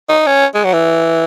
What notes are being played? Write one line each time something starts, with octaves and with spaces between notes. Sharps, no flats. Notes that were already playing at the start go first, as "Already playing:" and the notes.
D#4
C#4
G#3
F#3
E3